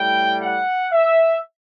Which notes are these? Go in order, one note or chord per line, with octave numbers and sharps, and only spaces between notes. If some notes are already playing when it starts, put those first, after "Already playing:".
Already playing: A2 G3 G5
F#5
E5